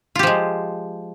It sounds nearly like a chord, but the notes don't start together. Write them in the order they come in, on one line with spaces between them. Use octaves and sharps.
F4 G4 F3 G#3